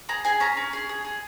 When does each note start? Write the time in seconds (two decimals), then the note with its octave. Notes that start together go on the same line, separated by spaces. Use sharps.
0.09 G#4 A#5
0.25 G#4 G#5
0.40 C#4 A#5
0.57 C#4
0.73 G#4
0.89 G#4
1.05 G#4